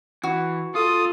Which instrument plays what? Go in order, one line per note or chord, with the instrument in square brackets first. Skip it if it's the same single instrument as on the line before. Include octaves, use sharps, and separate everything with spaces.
[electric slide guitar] E3 [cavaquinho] F#4
[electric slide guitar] F4 [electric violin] A4 [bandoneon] D#6